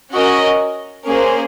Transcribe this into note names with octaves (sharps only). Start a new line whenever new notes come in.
C#4 F#4 A#4 D#5
A#3 C#4 G#4 C5